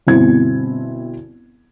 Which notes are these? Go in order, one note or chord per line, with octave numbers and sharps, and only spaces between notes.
G1 B2 C4 E4 G#6